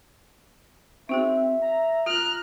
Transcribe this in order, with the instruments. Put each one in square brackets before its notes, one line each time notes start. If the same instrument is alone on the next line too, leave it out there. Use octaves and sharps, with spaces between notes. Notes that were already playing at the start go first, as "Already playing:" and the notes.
[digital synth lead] C4 [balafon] D#4 F#4 G#4 [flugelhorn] E5
[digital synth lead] A#5
[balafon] F4 [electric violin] F6 F#6